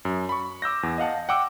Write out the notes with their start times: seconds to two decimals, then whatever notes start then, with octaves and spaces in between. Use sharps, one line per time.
0.05 F#2
0.29 B5 C#6
0.62 D6 E6 G6 A#6
0.83 E2
0.98 D#5 F5 F#5 A5
1.29 F#5 G5 D6 E6